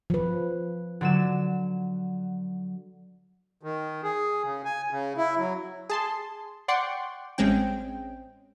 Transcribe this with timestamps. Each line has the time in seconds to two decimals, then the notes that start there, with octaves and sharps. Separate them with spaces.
0.10 F3 B4
1.01 D3 F#3 E7
3.63 D#3
4.03 G#4
4.44 C#3
4.65 G#5
4.91 C#3
5.17 E4
5.38 F#3
5.89 G#4 A5 C6
6.68 D5 F#5 G5 C6 C#6
7.38 A1 G#3 C4 C#4 G5